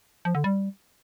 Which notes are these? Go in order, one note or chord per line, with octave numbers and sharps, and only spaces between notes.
F3
D3
G3